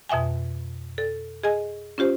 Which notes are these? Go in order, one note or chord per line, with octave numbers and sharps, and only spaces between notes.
F2 B2 E5 G5 G#5
A4
G#4 D#5 G#5
C#4 F4 G4 C5